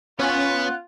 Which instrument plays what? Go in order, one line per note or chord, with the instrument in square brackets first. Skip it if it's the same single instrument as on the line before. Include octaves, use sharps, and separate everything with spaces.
[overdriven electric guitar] B3 [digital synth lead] C#4 [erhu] F4 [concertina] F#5